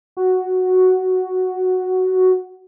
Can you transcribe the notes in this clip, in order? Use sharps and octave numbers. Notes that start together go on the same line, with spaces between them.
F#4